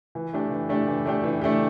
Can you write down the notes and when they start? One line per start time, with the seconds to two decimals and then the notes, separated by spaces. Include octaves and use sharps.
0.15 E3
0.33 A3 D4 G4
0.51 E3
0.69 A3 D4 G4
0.88 E3
1.05 A3 D4 G4
1.24 E3
1.42 A3 D4 G4